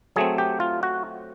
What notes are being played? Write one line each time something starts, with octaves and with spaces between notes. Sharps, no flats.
F#3 A3 C4 G#4
G4
F4
F#4